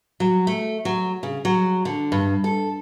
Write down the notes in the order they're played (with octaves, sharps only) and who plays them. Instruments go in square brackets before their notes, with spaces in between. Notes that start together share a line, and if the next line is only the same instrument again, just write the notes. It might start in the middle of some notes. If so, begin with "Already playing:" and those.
[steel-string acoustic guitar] F#3
A3
F#3
C#3
F#3
D3
G2
A4